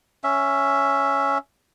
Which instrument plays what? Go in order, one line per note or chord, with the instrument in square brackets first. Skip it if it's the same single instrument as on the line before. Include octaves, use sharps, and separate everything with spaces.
[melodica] C#4 E5